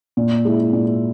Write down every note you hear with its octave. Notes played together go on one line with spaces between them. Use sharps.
A#2
G#3 E4
A#2